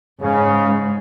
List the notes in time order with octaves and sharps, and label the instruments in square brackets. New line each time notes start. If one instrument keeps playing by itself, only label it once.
[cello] G#2 [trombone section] C#3